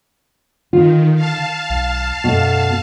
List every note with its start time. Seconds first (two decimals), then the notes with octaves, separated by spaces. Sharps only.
0.73 D3 D#3 F4
1.15 F5 A5
1.70 B1
2.24 F#2 B2 A3